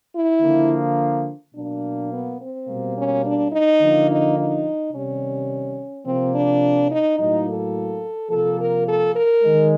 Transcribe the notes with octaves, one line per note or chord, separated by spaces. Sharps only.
E4
D3 F3 A#3
B2 F#3 A#3 D4
B3
C4
B2 G3 A#3
C#4
D4
D#4
D3 F3 A#3
D#4
D#4
C3 D#3 G3 C#4
C3 F3 A#3 C4
D4
D#4
A2 F#3 A#3 D#4
A4
C3 F3 A#3 A4
A#4
A4
A#4
D#3 G#3